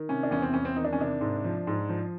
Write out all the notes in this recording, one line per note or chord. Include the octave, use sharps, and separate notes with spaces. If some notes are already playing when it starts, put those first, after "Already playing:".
Already playing: D#3
C3 C#4
D4
E2 C#4
C4
E2 C#4
C4
D#3 D#4
D4
C#4
C3 D4
G#2
F3
G#2
F3